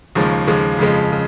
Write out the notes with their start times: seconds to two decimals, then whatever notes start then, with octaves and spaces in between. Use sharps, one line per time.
0.15 D#2 C#3 F3 G#3
0.47 D#2 C#3 F3 G#3
0.79 F2 C#3 F3 G#3
1.12 C#3